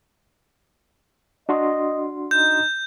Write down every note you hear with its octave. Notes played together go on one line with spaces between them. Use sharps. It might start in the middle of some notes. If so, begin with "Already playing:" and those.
D4 F#4 D#5 C6
D#4 G6